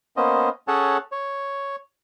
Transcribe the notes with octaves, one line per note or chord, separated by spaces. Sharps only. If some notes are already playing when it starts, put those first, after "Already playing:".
A#3 B3 C#4 C5 D#5
C#4 G#4 A4 C#5 F#5 A5
C#5